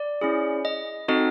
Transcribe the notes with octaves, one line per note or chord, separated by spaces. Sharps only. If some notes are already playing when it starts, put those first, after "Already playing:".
Already playing: D5
C#4 E4 G#4
D#5
C4 D#4 F#4 A4 D#5